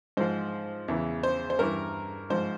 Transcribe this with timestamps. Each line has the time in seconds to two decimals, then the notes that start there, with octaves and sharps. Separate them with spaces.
0.17 G#2 F3 C5
0.88 E2 C#3 E3
1.23 C5
1.50 C5
1.59 G2 E3 A#4
2.30 G#2 F3 C5